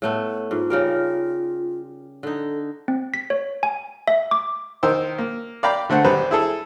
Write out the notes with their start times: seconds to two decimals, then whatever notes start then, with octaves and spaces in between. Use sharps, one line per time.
0.02 A2 A3 B3
0.51 G#2 F4
0.70 C#3 G3 A#4
2.23 D3 D#4 A4
2.88 C4
3.14 B6
3.30 C#5
3.63 G#5
4.08 E5
4.31 D6
4.83 D#3 A#4 C5 E6
5.18 A#3
5.63 D5 F5 G5 A#5 B5
5.90 D3 A3 C5 F#5
6.05 G#1 G3 B4 C5 A#5
6.31 E4 G#4 A4